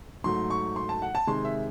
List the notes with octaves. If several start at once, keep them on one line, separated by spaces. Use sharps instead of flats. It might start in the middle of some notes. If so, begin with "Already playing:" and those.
G#2 F#3 A3 C6
C#6
C6
A5
F#5
A5
C3 D#3 G#3 C6
E5